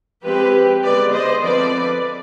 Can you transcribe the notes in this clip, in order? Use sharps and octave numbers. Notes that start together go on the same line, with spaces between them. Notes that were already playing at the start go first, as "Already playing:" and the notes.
F3 G#3 C4 G4 B4
D3 G#3 B3 B4 D5
C5 D#5
D3 F3 C4 B4 D5